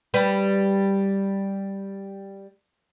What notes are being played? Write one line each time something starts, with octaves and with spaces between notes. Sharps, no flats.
G3 B4